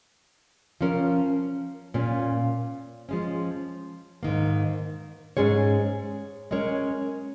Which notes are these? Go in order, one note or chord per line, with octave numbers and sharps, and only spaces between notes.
F3 C#4 A#4
A#2 A#3 C#4
F3 G#3 C#4
G#2 D#3 A#3
G#2 G#3 C#4 G#4 C#5
G#3 C#4 A#4 C#5